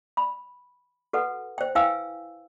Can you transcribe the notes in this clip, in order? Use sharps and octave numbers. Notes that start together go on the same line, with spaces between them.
B5
F#4 A4 B4 F#5
C5 G5
E4 B4 F5 G5 G#5 E6